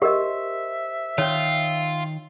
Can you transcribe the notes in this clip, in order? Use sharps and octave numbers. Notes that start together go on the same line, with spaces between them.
G4 A#4 C5 D#5 E5
D#3 F4 C#5 G5